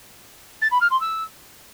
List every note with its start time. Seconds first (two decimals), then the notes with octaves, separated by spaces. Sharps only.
0.61 A6
0.71 B5
0.81 F6
0.90 C6
1.00 E6